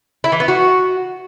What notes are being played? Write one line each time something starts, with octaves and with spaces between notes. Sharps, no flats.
E4
E3
B3
F#4